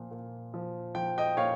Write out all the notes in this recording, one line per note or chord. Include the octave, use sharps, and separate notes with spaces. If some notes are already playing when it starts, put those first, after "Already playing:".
Already playing: A#2 F3
A#2
F3
F3 G5
D#5 G5
A#2 C#5 F5